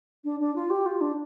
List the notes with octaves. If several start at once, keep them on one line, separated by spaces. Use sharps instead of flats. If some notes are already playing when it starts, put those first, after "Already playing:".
D4
D4
F4
G4
F4
D4